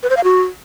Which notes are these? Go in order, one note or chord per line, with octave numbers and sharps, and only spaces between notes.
B4
C5
F5
F#4